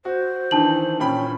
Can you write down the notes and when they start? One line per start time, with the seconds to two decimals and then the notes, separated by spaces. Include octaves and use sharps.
0.05 F#4 C5
0.51 D#3 E3 D4 A5 F#7
1.00 A#2 C#4 G5 B5